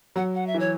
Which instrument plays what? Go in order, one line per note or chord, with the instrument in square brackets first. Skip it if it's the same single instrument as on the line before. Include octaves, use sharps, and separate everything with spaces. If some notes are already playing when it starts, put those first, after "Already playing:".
[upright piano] F#3 [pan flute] F#5
[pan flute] F#5
E5
[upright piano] E3
[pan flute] C#5